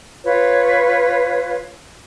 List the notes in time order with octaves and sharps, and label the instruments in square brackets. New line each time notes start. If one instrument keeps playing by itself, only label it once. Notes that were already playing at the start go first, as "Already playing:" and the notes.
[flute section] F4 B4 C#5